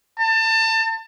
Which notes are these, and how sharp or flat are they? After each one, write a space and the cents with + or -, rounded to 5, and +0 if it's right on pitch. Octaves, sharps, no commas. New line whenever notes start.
A5 +30